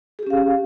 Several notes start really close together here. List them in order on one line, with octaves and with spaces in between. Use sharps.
G#4 G4 C#4 F5